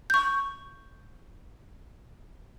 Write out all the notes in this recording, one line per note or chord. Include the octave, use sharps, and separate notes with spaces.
C#6 G6